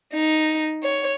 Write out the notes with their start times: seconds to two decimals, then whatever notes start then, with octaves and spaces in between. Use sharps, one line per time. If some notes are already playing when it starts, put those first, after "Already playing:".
0.14 D#4
0.83 C#5